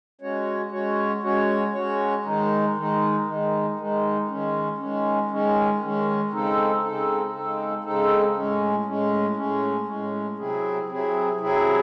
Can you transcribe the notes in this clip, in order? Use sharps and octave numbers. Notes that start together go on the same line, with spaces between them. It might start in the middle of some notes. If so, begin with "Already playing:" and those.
G#3 C#4 F#4 C#5
G#3 C#4 F#4 C#5
G#3 C#4 F#4 C#5
G#3 C#4 F#4 C#5
D#3 G#3 D#4
D#3 G#3 D#4
D#3 G#3 D#4
D#3 G#3 D#4
D#3 G#3 C#4
D#3 G#3 C#4
D#3 G#3 C#4
D#3 G#3 C#4
C#3 G#3 C4 D#4 A4
C#3 G#3 C4 D#4 A4
C#3 G#3 C4 D#4 A4
C#3 G#3 C4 D#4 A4
A2 G#3 C#4
A2 G#3 C#4
A2 G#3 C#4
A2 G#3 C#4
C3 F#3 C4 E4 G#4
C3 F#3 C4 E4 G#4
C3 F#3 C4 E4 G#4